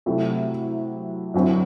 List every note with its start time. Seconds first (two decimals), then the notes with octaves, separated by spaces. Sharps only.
0.06 C3 F#3 A3 E4
1.34 F#2 D3 F#3 C4 E4